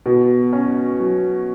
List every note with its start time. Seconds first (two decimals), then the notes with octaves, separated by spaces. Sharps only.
0.06 B2
0.53 C#4
1.00 F#3